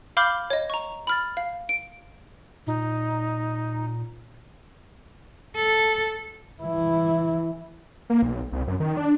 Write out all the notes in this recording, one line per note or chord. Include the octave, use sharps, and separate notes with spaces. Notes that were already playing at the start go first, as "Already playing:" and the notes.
F5 B5 D6 F6 G6 G7
C#5 D#5
A#5 C#6
B5 F6 A6
F5
D7
A#2 D#4
A4
E3 E4
A#3
B1
C2
F#2
D#3
D4